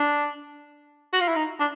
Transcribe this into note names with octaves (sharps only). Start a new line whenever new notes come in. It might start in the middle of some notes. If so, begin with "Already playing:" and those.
Already playing: D4
F#4
F4
E4
D#4
D4